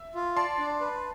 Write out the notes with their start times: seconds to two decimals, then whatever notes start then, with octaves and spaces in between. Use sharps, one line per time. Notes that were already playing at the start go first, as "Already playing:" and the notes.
Already playing: E5
0.15 F4
0.37 D5 A5 C6
0.58 D4
0.80 B4